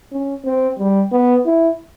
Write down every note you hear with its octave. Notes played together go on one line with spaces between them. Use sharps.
C#4
C4
G3
B3
E4